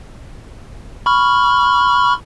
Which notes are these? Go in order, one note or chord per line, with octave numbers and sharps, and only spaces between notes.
B5 C#6 F6